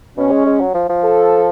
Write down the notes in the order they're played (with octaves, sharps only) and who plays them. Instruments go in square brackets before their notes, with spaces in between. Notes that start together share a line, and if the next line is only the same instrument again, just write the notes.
[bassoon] B2 [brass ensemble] C#4
[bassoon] G#3
G#3
F#3
F3
F3
[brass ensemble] A4